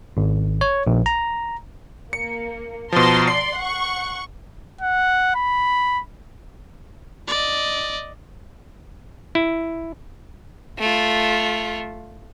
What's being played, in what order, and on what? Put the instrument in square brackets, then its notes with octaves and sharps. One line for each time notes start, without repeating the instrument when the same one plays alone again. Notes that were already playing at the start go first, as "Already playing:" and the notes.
[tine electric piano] G#1
C#5
A#1
A#5
[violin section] A#3 [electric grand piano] C#7
[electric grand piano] B2 F3 [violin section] A5 A#5 C6
[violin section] D5 C6 [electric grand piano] C7
[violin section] F#5 C#6
[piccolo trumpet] F#5
B5
[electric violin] D5 D#5
[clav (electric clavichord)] E4
[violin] A3 F4